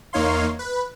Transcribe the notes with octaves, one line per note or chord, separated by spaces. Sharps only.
E2 A#3 D#4 C#5 F5 C6
B4